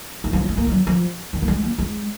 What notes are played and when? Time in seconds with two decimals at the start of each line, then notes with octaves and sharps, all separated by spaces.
0.24 D#3
0.33 F3
0.41 F#3
0.49 G#3
0.57 A#3
0.67 F3
0.72 F#3
0.87 F3
1.33 D#3
1.42 A#3
1.48 G#3
1.63 A#3
1.78 G#3